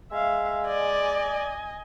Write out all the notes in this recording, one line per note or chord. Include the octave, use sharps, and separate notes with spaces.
G#3 E5 F5
D5 D#5 G#5